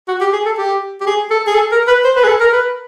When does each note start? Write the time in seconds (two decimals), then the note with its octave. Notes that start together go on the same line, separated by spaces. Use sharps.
0.08 F#4
0.20 G4
0.33 G#4
0.45 A4
0.58 G4
1.01 G4
1.07 G#4
1.30 A4
1.47 G#4
1.55 A4
1.72 A#4
1.87 B4
2.04 C5
2.16 B4
2.24 G#4
2.28 A4
2.40 A#4
2.53 B4